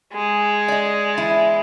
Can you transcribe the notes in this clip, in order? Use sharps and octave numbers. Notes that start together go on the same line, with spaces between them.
G#3
D5 D#5
E2 E4 A5